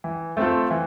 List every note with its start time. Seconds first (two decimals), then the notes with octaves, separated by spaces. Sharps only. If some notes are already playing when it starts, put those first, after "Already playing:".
0.04 E3
0.37 A3 C4 F4 A4
0.71 E3